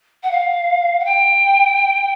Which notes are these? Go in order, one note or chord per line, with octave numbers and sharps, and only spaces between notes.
F#5
F5
F#5
G5